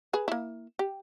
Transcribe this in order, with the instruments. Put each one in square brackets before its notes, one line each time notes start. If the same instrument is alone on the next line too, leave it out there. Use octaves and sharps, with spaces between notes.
[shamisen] G#4 B4
A#3 E4
G4